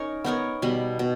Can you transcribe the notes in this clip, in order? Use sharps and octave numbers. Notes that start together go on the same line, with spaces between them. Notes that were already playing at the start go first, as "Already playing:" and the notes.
Already playing: C#4 D#4 A#4 C#5
B3 D#4 A#4 C#5
B2 G3 B3
B2